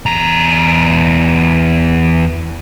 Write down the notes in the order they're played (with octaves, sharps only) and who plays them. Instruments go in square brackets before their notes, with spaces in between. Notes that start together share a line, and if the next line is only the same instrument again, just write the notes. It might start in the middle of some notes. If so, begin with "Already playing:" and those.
[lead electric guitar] E2 A#5